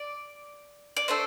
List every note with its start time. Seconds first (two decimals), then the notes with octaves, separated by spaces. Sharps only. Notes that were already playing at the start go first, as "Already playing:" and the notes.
Already playing: D5
0.97 D5
1.08 A3 D4 A4 C5